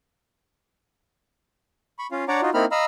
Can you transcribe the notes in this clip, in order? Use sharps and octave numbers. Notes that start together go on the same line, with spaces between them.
B5 C#6
C#4 F4 F5
D4 C#5 D5 F#5 A#5 D6
D#4 F4 F#4
A#3 C4 D#4 E4 B5 F6
D#5 F5 A#5 B5 E6 F6